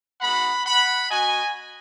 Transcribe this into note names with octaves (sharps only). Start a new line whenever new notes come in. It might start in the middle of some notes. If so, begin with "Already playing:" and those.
G#3 B3 D#4 F#4 F#5 B5
F#5 B5
B3 F#4 D#5 G#5